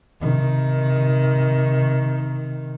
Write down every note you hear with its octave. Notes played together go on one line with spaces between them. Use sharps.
C3 D#3